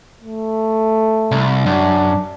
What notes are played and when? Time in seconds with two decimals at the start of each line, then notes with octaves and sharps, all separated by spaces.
0.22 A3
1.32 C2
1.66 F#2 D4